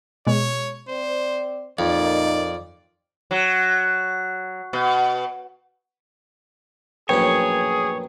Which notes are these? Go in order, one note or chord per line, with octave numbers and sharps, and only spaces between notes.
B2 G#3 C#5
C4 C5 D5
F2 A#2 A#3 D#4 D5
F#3
B2
A#1 F#2 A2 G#4 B4 C#5 G5